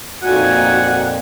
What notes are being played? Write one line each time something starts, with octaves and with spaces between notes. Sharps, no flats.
F2 A#2 A#3 D#4 F#4 F#5 G#5